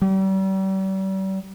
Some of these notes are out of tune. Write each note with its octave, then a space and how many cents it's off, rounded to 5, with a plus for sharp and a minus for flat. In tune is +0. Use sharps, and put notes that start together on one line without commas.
G3 -40